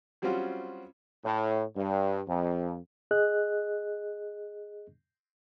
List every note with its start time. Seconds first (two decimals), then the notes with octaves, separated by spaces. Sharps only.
0.22 F#3 G3 C4 C#4 F4 F#4
1.24 A2
1.75 G2
2.26 F2
3.11 G#4 D#5 F#6